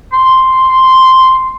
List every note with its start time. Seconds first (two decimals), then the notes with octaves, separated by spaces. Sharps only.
0.13 C6